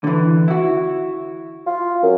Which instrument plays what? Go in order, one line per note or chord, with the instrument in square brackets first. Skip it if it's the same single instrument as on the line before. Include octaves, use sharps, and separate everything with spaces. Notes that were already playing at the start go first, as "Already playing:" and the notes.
[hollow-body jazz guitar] D3 E3
E4 F#4
[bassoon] F4
F#2